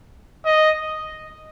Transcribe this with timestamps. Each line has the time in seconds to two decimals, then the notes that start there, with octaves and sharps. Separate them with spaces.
0.45 D#5